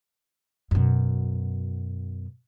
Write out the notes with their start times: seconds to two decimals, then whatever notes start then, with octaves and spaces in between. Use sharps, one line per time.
0.71 F#2 B2